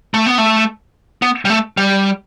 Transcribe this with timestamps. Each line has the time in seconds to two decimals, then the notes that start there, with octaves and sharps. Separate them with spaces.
0.14 A3
0.26 B3
0.38 A3
1.22 B3
1.45 G3
1.50 A3
1.77 G3